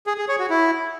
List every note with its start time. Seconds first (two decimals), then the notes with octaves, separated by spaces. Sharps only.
0.07 G#4
0.18 G#4
0.28 C#5
0.39 F#4
0.50 E4